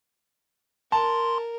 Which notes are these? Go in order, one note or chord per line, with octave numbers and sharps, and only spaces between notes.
A#4 A5 C6